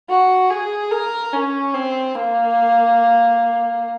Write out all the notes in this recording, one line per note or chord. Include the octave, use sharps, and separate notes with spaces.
F#4
G#4
A#4
C#4
C4
A#3